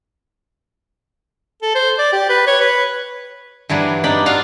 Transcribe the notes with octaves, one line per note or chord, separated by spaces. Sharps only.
A4
C5
D5
G4
B4
C#5
B4
G2 E3 F#3 D4
D4 D#4 D5 B5
D4 F4 F#4 F5